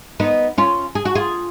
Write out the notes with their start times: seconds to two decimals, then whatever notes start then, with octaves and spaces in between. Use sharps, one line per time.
0.20 B3 D#4
0.58 C#4 F4
0.95 G#4
1.05 F#4
1.15 F4 G#4